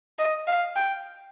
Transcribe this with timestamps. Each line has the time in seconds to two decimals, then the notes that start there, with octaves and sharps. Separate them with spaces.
0.19 D#5
0.47 F5
0.76 G5